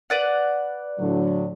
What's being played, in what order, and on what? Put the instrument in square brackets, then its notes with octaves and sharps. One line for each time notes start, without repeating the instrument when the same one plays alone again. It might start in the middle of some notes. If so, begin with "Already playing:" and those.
[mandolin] B4 D5 F#5
[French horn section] A2 D3 F#3